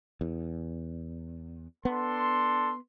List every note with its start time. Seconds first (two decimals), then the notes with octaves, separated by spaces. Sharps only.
0.21 E2
1.85 B3 D4 A4 C6